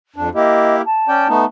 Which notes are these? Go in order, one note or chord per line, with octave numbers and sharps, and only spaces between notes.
F2 D4
A#3 E4 G4 D#5
A5
C#4 D5 G5
A3 B3 D#4